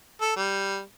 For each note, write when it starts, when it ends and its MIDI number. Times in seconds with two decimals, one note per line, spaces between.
0.21 0.32 69
0.36 0.81 55